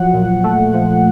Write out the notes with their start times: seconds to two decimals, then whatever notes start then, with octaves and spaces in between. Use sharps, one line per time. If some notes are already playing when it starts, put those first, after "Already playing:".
Already playing: F3 F#3 F#5
0.13 A#2
0.44 A3
0.74 F3